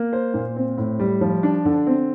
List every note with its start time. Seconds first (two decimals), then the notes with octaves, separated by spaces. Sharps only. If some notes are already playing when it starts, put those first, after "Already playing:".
Already playing: A#3
0.13 C5
0.34 A#2
0.56 C4
0.78 A2
1.00 G3
1.21 F3
1.43 D4
1.65 D3
1.87 C4